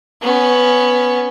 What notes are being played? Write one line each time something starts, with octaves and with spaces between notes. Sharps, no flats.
B3 C#4